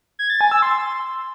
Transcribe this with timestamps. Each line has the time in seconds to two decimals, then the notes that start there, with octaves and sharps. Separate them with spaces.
0.19 G#6
0.30 A6
0.41 G#5
0.52 E6
0.62 C6